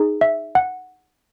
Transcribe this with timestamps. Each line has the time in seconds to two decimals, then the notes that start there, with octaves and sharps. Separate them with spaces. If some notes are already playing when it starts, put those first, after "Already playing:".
Already playing: D#4 G#4
0.21 E5
0.55 F#5